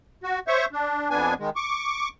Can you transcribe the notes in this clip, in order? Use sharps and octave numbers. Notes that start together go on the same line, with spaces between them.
F#4
C5 C#5 E5 C#6
D4
F2 B3 D4 G#5
D#3 G#3
C#6 D6